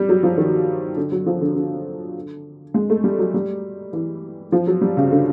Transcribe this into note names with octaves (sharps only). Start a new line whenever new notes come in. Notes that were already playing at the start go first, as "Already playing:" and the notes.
Already playing: G3
F#3
F3
D#3
D3
F#3
F3
D3
D3
G#3
A3
G3
F#3
G3
E3
F3
F#3
G3
C#3
D3